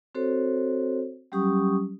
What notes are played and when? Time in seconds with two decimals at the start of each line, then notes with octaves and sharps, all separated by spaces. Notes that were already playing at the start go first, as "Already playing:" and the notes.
0.15 C4 F#4 A4 C5 C#5
1.32 F#3 G3 C#4 G4 C#6 D#6